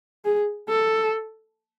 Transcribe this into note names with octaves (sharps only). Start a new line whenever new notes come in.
G#4
A4